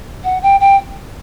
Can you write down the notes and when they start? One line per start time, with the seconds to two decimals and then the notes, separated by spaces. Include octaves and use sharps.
0.24 F#5
0.42 G5
0.60 G5